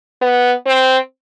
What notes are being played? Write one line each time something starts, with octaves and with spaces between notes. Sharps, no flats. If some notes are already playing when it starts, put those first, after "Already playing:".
B3
C4